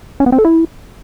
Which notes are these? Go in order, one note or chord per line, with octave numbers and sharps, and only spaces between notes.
C#4
B3
C4
A4
E4